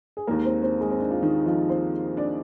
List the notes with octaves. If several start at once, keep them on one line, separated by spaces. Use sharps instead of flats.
G#4
D#2 D#3 G#3 A#3 A#4
C4 C5
C4 C5
G#3 G#4
C4
D4
F4
D#3 D#4
F3 F4
C4 C5
D4 D5